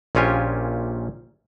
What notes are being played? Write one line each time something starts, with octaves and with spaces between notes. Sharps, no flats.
A#1 A#2 C#4 F4 G4 G#5